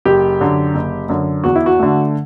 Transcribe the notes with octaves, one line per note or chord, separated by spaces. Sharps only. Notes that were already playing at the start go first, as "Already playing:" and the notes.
F#1 G4
F#2 D3
F#1
F#2 D3
E2 F#4
E4
F#4
D3 A3